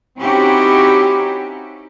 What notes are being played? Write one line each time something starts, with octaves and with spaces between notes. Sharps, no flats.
C4 C#4 D#4 E4 F#4 G4